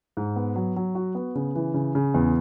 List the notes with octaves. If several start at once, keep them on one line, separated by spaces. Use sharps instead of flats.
G#2
B3
F#3
F#3
F#4
B3
C#3
E3
C#3
C#3
E2